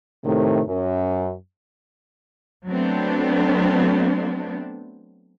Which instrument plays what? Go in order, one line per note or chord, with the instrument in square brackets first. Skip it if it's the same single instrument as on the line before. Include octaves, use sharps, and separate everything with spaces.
[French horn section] A2 C3 D#3 A3
F#2
[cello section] F#3 A3 B3 C4 D4